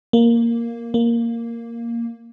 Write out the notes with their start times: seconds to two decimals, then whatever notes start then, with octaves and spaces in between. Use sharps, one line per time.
0.13 A#3
0.94 A#3